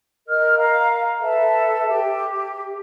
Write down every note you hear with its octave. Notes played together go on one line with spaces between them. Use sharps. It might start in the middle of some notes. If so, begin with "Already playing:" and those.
A#4 D#5 F6
F5 A#5
A4 B4 E5 A5
G4